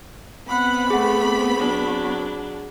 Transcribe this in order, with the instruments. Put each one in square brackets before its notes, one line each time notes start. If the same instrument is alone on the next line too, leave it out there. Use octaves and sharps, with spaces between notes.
[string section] B3 C4 B5 [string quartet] F#5
[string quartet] A3 [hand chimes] G#4 F#5
[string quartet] F#3 D4